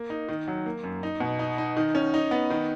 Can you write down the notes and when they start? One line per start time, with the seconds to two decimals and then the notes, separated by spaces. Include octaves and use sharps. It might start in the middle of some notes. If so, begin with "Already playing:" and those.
Already playing: A#3
0.10 D#4
0.29 D#3
0.48 F#3
0.66 A#3
0.84 F#2
1.03 D#4
1.20 B2
1.39 D#4
1.58 D#4
1.77 D#3
1.95 C#4
2.14 D#4
2.31 B3
2.50 D#3